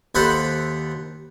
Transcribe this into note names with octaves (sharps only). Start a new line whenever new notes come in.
D#2 A4 C5 F#5 B5